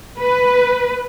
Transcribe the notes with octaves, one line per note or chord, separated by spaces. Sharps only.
B4